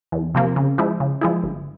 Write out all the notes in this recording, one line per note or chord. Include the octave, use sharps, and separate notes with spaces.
E2
C3 F3 A#3
C#3
F3 G#3 E4
C#3
F3 G#3 E4
G1